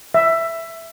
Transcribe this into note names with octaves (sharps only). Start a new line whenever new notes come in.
E5